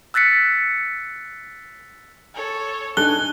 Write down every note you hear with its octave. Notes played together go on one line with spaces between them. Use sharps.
E6 F#6 A6 B6 C#7
A4 C#5
D4 D#4 A4 G#5 F#6 G7